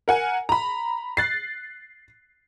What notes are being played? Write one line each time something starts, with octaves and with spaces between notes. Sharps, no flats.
A#4 F#5 G#5
A#5 B5
F#6 A6 C7